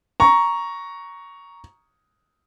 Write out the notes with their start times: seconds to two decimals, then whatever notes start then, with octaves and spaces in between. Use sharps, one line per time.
0.20 A#5 C#6